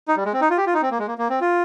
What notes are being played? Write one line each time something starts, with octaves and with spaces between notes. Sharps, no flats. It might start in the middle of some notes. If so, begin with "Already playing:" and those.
D#4
G3
G#3
C4
D#4
F4
G4
F4
D#4
C4
A#3
G#3
A#3
A#3
C4
F4